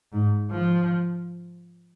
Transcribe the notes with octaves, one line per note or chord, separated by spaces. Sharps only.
G#2
F3